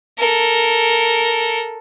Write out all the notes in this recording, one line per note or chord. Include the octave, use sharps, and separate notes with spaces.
A4 A#4